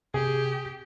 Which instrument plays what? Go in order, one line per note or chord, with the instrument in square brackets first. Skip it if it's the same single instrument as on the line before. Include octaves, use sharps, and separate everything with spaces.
[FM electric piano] C3 [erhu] G4 [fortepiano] G#4